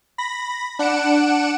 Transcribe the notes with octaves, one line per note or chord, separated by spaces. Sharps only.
B5 A#6
D4 F#5 C#7 D7 E7